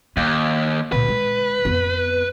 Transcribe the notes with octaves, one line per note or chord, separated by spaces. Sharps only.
D#2 A#3
D2 A#2 B4
G#3
F2 B3